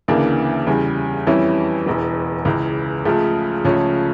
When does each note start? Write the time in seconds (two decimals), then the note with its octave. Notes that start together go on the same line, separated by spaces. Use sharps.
0.08 D2 C#3 E3 A#3 D4
0.67 E2 C#3 G3
1.27 F2 E3 G3 C#4 E4
1.86 E1 E2 E3
2.45 C#2 C#3 E3
3.05 C#2 C#3 F3 A3
3.65 C#2 C#3 F3 A3 C#4